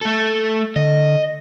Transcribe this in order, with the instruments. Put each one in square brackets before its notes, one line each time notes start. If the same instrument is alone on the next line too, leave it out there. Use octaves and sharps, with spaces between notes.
[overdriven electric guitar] A3 A4
[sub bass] D3 [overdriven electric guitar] D#5